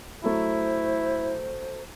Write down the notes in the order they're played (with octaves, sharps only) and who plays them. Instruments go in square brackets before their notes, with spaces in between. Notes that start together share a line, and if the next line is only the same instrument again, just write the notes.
[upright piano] F#3 A3 [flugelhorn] E4 [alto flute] C5